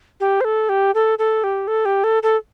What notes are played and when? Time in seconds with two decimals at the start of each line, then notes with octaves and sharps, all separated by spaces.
0.20 G4
0.41 C5
0.45 A4
0.69 G4
0.95 A4
1.19 A4
1.44 G4
1.67 A4
1.85 G4
2.04 A4
2.23 A4